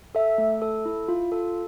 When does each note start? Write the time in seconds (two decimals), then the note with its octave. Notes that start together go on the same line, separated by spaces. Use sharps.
0.15 A4 E5
0.38 A3
0.62 A4
0.85 E4
1.08 F4
1.32 A4